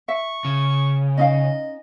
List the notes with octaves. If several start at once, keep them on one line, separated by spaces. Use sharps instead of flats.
E5 C#6
C#3
C#4 D#4 D#5 F5